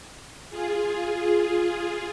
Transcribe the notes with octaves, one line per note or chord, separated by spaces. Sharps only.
F4 G#4